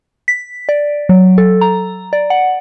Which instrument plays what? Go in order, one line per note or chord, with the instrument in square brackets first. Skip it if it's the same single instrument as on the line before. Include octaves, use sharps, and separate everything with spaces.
[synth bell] B6
D5
F#3
A4
A#5
D5
F#5